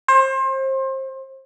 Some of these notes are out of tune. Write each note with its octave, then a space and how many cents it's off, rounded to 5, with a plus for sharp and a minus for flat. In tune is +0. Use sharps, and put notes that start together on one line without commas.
C5 +30